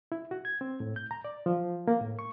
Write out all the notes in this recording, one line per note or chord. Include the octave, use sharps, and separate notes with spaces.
E4
F#4
G#6
C4
A2
G6
A#5
D5
F3
A#3
A2
C#6